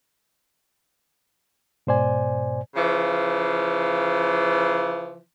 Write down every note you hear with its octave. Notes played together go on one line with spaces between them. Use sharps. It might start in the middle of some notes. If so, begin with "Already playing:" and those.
G#2 B2 C5 D5 G#5
C#3 E3 F3